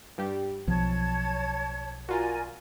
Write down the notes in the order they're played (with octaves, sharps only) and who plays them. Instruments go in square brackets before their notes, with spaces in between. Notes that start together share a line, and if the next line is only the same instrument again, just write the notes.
[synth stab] G2 G3 G4
[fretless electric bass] B1 F3 [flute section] C#5 A5 G#6
[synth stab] F4 F#4 [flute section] A#4 D5 G#5